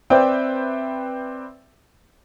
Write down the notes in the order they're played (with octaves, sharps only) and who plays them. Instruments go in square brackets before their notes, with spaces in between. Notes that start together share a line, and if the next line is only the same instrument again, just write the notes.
[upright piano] C4 B4 C5 D5 E5 G5